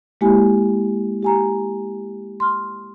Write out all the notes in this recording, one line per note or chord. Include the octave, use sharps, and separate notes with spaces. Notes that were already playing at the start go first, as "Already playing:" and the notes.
G#3 A#3 E4 G4 G#5
G4 G#5 A#5
C6 F6